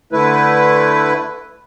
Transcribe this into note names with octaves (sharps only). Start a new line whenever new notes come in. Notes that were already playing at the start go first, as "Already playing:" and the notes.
D3 A3 E4 B4